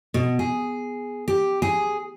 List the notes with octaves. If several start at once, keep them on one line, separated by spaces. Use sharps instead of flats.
B2
G#4
G4
G#4